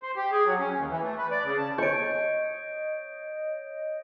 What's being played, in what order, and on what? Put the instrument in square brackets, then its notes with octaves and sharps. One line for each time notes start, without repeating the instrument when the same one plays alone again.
[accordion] C5
G4
G#4
F#3
C#4
D#2
E3
A3
B4
D5
C#3
A5
[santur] C#5 C#6 [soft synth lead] D#5 [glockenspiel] G6 D7